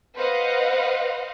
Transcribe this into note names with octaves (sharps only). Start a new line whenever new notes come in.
B4 C5 D#5 F5 F#5